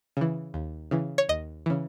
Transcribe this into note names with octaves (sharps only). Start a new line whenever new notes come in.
C#3 E3
D#2
C#3 E3
C#5
D#2 D#5
C#3 E3